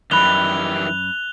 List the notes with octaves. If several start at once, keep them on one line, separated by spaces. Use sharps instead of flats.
F#2 D#3 E3 G3 B5 F#6 F7 G7